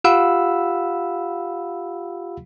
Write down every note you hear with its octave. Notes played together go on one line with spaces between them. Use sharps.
F4 G4 F5 F#5 B5 E6